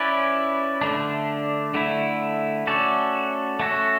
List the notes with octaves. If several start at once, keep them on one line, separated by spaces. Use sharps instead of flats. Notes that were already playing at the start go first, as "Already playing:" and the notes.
Already playing: C#4 E4 B4 D5
D3 A3 D4
D3 A3 E4
A3 C#4 F#4 A4 D5
A3 C#4 F#4 A4